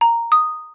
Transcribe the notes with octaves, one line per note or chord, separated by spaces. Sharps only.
A#5
D#6